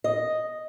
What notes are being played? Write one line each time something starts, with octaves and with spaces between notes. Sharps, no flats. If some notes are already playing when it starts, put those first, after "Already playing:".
D#5